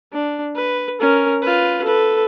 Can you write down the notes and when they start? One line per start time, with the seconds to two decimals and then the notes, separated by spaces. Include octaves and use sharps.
0.13 D4
0.55 B4
1.00 C#4 A#4
1.42 F4 B4
1.84 A4 B4